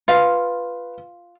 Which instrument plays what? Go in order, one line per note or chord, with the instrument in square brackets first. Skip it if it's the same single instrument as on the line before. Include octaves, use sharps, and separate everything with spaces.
[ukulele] F4 F5 [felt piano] B4